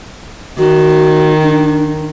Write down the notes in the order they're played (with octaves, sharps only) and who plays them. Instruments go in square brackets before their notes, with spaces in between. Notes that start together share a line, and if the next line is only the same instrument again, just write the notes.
[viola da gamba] D#3 [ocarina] F#4
[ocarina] D4